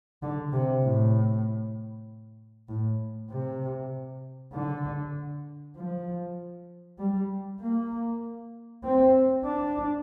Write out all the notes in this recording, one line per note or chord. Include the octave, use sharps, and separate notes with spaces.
D3
C3
A2
A2
C3
D3
F3
G3
A#3
C4
D4